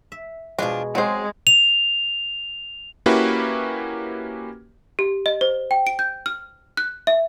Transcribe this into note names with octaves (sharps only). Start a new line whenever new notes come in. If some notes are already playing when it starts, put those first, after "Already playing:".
E5
B2 F3 F#3 G#3 D4
F#3 G#3 C4 C5
F7
A#3 C#4 E4 F#4 G4 B4
G4
D#5
C5
G5
D7
G6
F6
F#6
E5